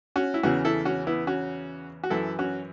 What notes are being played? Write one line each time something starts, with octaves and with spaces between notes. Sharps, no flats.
C#4 F#4
E4
E2 C#3 E3 C#4 F#4
E4 A4
C#4 F#4
B3 E4
C#4 F#4
F#4
F#2 E3 E4 A4
C#4 F#4